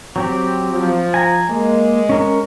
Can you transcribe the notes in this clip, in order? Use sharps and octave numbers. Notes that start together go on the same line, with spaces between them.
F#3 C4 G4
F3
G#5 A#5
G#3 A#3
C#4 A#4 C#5